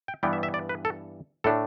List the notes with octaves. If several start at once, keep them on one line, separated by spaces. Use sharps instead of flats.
G5
G2 E3 G3 B3 G5
E5
E5
D5
B4
A4
A2 A3 D4 A4